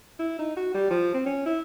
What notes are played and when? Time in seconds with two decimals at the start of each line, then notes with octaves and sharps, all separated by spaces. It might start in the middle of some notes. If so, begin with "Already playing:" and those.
0.20 E4
0.39 D#4
0.57 F#4
0.75 G3
0.91 F3
1.14 C4
1.26 C#4
1.46 E4